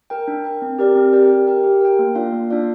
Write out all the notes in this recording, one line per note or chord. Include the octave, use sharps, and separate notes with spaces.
A#4 G5
D4
A#4 G5
C4
G4 A#4 D5 G5
C4
G4 A#4 D5 G5
G4
A#4 G5
G4
A#4 G5
A#3
D4 F4 D5 F5
A#3
D4 F4 D5 F5